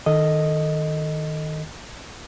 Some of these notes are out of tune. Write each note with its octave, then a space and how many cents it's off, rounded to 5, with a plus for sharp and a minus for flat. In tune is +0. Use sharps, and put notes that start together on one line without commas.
D#3 +0 A4 +10 D#5 +0